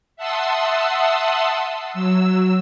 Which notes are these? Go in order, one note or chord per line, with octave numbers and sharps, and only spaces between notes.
E5 F#5 A5 C6 D#6 E6
F#3 E6